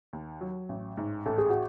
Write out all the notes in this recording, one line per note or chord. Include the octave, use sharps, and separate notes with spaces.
D#2
F#3
A1
G#2
A1 A4
G#4
F#4